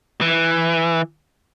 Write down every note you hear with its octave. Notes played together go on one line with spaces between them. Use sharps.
E3